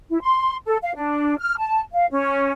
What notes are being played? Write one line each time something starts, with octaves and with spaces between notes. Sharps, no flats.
E4
C6
A4
F5
D4
F6
A5
F5
C#4